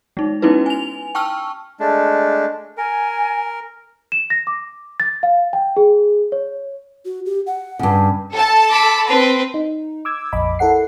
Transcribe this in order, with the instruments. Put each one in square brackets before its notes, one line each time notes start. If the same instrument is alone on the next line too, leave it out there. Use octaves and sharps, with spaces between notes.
[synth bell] G#3 D#4
B3 C#4 D#4 E4 F#4 B4
G#5 F7
G5 A5 C#6 E6 F6
[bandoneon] G#3 A3 D4
[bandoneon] A#4 [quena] G#5
[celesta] E7
A#6
D6
A6
F5
G5
G#4
C#5
[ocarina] F#4
G4
F#5
[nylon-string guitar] G2 C#3
[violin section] A4 A5
[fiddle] B5 D6
C4 B4
[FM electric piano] D#4
D6 E6 G#6
A#1 F2 D#5 B5 D6
E4 A4 A#4 F#5 C7